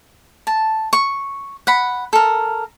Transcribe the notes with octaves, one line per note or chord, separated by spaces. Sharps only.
A5
C#6
F#5 B5
A4 A#4